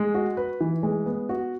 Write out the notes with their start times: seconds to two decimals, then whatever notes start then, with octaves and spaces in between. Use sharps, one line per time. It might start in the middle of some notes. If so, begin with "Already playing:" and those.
Already playing: G#3
0.14 F#4
0.37 B4
0.61 E3
0.83 G#3
1.06 B3
1.29 F#4